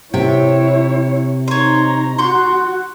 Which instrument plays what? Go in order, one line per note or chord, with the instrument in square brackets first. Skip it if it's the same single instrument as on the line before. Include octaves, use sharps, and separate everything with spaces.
[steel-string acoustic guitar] C3 [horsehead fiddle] E4 C#5 [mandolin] G5
[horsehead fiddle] D#4 A#5 [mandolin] C5 C#5
[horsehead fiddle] F#4 [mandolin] C6 C#6 G6